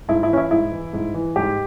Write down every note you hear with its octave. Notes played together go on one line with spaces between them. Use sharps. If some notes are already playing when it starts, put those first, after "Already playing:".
G#2 E4
E4
E3 C#4
E4
G#2 E4
E3
G#2
E3
G#2 G4